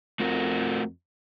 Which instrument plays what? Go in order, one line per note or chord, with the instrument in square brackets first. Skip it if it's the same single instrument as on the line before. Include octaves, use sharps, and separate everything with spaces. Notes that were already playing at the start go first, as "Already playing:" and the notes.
[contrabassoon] F2 [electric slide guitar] A3 F#4 A#4